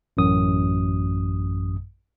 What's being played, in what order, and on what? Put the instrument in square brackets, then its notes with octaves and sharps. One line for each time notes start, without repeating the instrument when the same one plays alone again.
[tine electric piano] A1 F#2 D#6